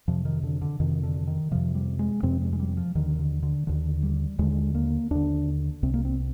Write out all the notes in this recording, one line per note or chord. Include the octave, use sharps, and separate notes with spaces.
F2 C3 F3
D#3
D3
D3
F2 C3 D#3
D3
D#3
F2 C3 F3
G3
G#3
F2 C3 C4
G#3
G#3
G3
F3
D#2 D3 D#3
D3
D3
D#2 D3 D#3
G3
D#2 D3 G#3
A#3
D#2 D3 D4
C2 C3 C4
A#3
C4